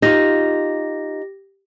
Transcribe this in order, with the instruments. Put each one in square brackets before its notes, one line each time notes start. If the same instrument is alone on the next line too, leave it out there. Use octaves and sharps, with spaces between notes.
[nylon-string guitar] D#4 F4 [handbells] G4 A#6